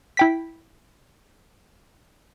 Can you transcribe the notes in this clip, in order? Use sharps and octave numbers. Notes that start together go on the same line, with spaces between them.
E4 G5 B6